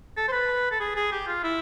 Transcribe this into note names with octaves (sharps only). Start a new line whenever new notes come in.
A4
C5
B4
A4
G#4
G#4
G4
F4
E4